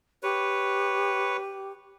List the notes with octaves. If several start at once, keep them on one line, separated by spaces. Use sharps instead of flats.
G4 B4 C#5